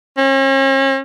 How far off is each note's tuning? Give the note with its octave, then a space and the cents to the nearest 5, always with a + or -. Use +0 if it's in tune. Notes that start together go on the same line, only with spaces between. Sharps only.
C#4 -40